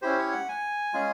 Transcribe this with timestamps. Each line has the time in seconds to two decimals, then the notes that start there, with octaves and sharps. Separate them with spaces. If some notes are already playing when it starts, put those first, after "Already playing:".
0.02 C#4 E4 G4 C5
0.18 C#5
0.32 F#5
0.48 G#5
0.94 G#3 C#4 F4 G#4